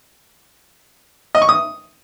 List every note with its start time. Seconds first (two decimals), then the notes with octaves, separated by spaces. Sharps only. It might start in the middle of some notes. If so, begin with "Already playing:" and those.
1.35 D#5
1.42 C#6
1.49 D#6